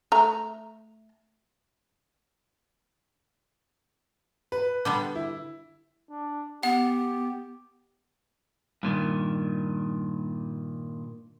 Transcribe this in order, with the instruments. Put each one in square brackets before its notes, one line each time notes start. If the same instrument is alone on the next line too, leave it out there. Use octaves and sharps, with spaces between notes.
[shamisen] A3 A#5
[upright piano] B4
[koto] D3 G3 B3
[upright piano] E4
[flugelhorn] D4
[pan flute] B3 [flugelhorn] G4 [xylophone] F#5
[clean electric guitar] G2 A#2 D#3